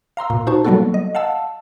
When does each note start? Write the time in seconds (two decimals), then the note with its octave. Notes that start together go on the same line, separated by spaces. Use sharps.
0.17 F5 A#5 C6 E6
0.30 A#2
0.47 D#4 F#4 C5 A5 C#6
0.65 F#3 G3 A#3 B3 F#4 A4
0.94 D#5
1.15 F5 F#5 A5 E6